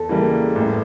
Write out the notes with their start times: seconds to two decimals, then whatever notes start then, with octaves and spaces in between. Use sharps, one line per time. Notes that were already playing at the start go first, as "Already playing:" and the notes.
Already playing: E2 A4
0.09 C#3 E3 G3 A#3
0.56 A1